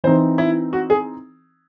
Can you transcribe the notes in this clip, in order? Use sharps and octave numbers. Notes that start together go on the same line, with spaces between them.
E3 C4 D#4 C5
E4
F#4
G#4